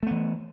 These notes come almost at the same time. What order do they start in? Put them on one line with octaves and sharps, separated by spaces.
A3 B3 E3